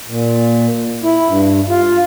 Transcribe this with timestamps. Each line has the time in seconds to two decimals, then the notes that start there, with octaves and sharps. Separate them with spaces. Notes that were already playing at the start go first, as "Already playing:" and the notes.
0.08 A#2
1.03 E4
1.28 G2
1.69 F4